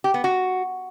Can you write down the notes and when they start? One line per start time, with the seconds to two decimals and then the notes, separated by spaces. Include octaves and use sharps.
0.04 G4
0.14 B3
0.24 F#4